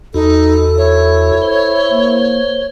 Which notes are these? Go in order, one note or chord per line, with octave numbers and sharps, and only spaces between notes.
E2 D#4 F#4 A4
E4 C#5
C5
A#3